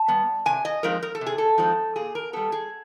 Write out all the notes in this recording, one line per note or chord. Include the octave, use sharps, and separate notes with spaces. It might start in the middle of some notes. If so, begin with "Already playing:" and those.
Already playing: A5
G3 B3
C3 G#5
D#5
F3 G#3 C4 D#4 A#4
A#4
A4
C3
G#4
A4
F3 G#3 C4 D#4
A#2 G#4
A#4
G3 B3 A4
G#4